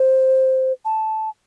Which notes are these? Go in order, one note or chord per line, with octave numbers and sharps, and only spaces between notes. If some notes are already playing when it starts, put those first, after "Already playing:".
Already playing: C5
A5